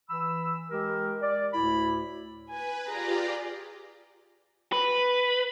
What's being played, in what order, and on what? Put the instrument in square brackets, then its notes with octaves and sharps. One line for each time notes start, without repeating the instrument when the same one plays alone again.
[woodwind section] E3 B5 E6
G#3 G4 A#4
D5
D2 A2 E4 B5
[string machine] B4 [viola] G#5
[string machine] F4 G4 D5 [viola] G#4 A#5
[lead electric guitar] B4